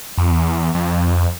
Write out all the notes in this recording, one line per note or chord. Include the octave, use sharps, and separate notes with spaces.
F2
E2
F2